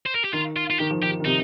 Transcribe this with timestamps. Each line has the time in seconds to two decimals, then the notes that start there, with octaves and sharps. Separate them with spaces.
0.06 C5
0.15 A#4
0.25 G4
0.33 D#3 F4
0.56 F4
0.70 F4
0.79 D#3 G4
0.91 F3
1.02 D#3 G4
1.20 D#3
1.25 C3 D#4